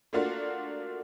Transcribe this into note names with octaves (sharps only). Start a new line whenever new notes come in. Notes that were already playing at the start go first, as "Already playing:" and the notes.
A3 A#3 D4 F4 F#4